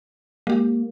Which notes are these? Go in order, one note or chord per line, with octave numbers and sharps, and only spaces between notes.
G#3 A#3 G4